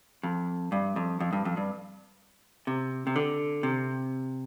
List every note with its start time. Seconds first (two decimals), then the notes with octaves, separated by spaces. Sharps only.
0.23 F2
0.72 G2
0.96 F2
1.20 F2
1.33 G2
1.45 F2
1.57 G2
2.67 C3
3.07 C3
3.16 D3
3.63 C3